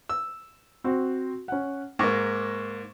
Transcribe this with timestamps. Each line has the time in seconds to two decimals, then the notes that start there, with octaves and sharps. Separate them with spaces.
0.09 E6
0.84 C4 F#4
1.48 C#4 F#5
1.99 G#2 A#3 C#6 D6 A#6